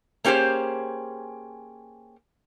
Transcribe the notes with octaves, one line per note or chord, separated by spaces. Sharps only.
A#3 C#4 G4 G#4 C5